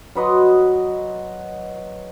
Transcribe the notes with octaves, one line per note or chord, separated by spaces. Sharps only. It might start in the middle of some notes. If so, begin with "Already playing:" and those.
F#3 B4 D#5 C6